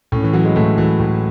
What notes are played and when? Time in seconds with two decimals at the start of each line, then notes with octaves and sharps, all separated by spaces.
0.12 A2 C#4
0.23 E3
0.33 E3 F#3
0.45 G#3
0.56 A2 A3
0.78 E3 F#3
0.99 A2